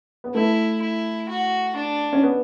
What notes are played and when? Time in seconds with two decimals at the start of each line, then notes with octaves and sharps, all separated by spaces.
0.24 B3
0.34 A3 E4
0.81 E4
1.29 F#4
1.76 D4
2.13 C#4
2.23 B3